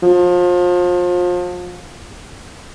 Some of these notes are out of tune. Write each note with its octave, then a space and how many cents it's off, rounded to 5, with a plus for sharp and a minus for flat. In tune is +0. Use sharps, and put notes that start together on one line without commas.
F3 +30